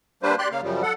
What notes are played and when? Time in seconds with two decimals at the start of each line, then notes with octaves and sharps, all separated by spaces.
0.23 G3 A#3 D4 B4 C5
0.38 G4 D5 C6 F#6
0.51 C#3 A#3 F5
0.63 F#2 C#3 F3 G3
0.83 A4 F#5